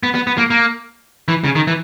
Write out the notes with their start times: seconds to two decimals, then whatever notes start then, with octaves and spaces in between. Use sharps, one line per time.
0.03 B3
0.15 B3
0.27 B3
0.38 A#3
0.50 A#3
1.28 E3
1.44 C#3
1.55 D#3
1.67 E3